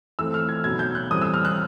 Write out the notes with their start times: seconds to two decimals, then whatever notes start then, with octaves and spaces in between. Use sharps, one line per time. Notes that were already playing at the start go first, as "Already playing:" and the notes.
0.19 E3 A3 C4 F4 E6
0.34 F6
0.49 G#6
0.64 B2 F#3 B3 D#4 G#6
0.79 G6
0.95 F#6
1.10 A2 E3 G3 C4 D#6
1.22 E6
1.34 F6
1.45 F#6